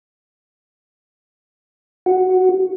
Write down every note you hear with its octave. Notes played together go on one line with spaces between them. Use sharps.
F#4